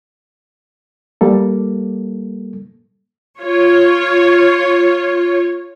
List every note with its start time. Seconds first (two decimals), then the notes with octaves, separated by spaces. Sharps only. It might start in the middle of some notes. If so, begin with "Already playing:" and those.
1.21 G3 A#3 A4
3.40 F4 C#5